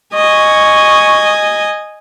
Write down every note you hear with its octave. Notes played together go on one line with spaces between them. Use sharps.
D#5 G#5 C#6